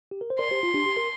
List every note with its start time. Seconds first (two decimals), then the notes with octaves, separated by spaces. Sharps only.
0.11 G4
0.21 A#4
0.30 C5
0.39 A#4 D5 C6
0.51 G4 C5
0.63 F4
0.74 D4 G4
0.86 G4
0.97 A#4